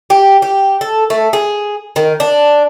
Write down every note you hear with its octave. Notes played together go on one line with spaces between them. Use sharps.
G4
G4
A4
A3
G#4
D#3
D4